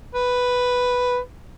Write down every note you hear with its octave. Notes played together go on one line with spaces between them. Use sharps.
B4